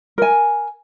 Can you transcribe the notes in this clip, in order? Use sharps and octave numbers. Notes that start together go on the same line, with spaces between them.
A#4 G#5